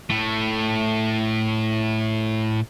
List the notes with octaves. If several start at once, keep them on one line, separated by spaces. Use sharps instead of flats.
A2 A3